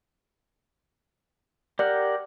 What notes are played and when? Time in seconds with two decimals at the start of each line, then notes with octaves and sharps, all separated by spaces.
1.79 G4 A#4 D5 F#5